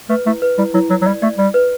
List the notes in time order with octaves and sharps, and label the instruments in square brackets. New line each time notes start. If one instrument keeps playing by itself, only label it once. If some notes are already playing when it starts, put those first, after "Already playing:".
[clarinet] A3 [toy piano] B4
[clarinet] A3 [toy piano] E4
[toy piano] B4
[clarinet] G3 [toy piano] E4
[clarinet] F#3 [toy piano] E4
[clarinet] F#3 [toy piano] E4
[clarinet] F#3
[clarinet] G3 [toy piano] D5
[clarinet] A3 [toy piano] D5
[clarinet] G3 [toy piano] D5
[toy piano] B4